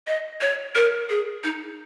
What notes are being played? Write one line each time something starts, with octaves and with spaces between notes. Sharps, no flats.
D#5
C#5
A#4
G#4
D#4